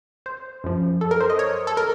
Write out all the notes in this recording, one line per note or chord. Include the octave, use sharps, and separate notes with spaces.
C5
F#2 F3
A4
A#4
C5
D#5
C#5
A4
A#4